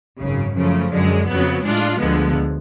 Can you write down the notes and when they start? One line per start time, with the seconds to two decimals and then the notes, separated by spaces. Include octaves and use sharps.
0.19 G#1 F#2 C#3
0.55 F#2 C#3 F3 A3
0.92 F#2 D3 G#3
1.27 F2 C#3 F#3 B3
1.63 A2 G#3 D4 F4
1.99 D2 D3 F3 G#3 B3